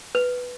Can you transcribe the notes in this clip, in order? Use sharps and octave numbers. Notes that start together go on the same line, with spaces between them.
B4